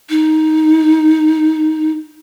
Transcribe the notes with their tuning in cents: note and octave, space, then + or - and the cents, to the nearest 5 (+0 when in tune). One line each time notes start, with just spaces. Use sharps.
D#4 +10